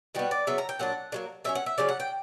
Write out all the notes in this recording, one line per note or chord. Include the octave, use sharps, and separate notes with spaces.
B2 G3 B3 F#4
D5
C#3 F#3 B3 E5
A#5
G5
A#2 F#3 D4 F#5
D3 F#3 A#3
D3 F#3 C#4 E5
F#5
E5
C#3 F#3 C#4 D5
F#5
G5